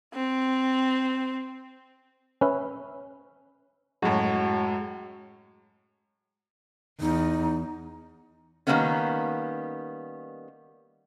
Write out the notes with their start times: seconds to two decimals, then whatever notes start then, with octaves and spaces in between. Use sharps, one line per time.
0.14 C4
2.41 C#4 B4 E5
4.02 F#2 A2 G#3 F#4
7.00 E2 D#4
8.67 D#3 F3 G3 A#3 B3 C#4